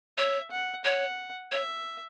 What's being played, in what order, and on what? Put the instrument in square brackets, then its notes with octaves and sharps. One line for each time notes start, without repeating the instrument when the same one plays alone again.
[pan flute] C#5 [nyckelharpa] E5
[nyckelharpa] F#5
[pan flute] C#5 [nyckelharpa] F#5
[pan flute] C#5 [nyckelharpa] E5